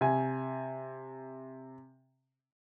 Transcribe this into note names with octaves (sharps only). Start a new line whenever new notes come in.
C3 G#5